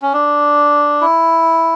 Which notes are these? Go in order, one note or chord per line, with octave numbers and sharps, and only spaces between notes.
C#4
D4
E4